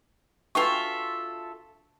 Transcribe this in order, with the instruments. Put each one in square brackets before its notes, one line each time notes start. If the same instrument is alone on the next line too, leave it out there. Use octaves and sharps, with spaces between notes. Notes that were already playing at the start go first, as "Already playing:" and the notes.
[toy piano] D4 C#6 [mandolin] F4 A4 E5 [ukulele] F#4 B4 G5